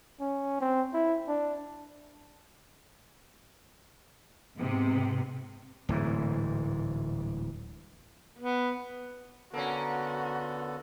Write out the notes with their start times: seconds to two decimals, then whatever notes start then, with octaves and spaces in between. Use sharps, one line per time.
0.20 C#4
0.60 C4
0.94 E4
1.28 D4
4.56 G#2 C3 B3
5.89 D1 G#2 E3
8.39 B3
9.54 D3 A#3 B3 C#4 F#4 A4